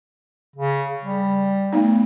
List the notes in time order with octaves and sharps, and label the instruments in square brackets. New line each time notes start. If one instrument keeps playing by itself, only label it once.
[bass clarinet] C#3
G3
[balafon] A3 B3 D#4